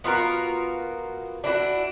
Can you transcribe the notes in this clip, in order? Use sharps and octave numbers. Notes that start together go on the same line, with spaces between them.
B3 F4 F#4 A#4
D4 E4 F#4